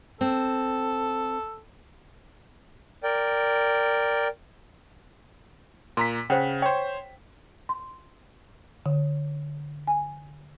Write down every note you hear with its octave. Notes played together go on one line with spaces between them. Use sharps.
C4 A4
A#4 D5 G5
A#2 A#5 C6 B6
C#3 C5 F#5 G5
C5 C#5 G5
C6
D3
G#5